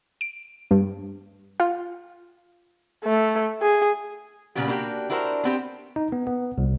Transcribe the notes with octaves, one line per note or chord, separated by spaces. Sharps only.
D7
G2
F4
A3
G#4
A#2 C#3 G3 B3 G4
A#3 D4 E4 F#4 G4
D4 E4 F#4 A#4 C5
B3 C4 G4
D#4
B3
B3
C2